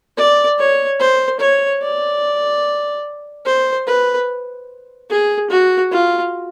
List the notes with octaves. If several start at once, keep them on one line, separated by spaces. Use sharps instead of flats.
D5
C#5
C5
C#5
D5
C5
B4
G#4
F#4
F4